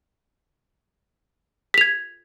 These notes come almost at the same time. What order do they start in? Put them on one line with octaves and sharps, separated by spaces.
B6 F7 G#6